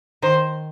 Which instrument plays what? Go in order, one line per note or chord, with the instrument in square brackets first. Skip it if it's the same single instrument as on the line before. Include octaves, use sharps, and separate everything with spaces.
[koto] D#3 [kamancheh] C5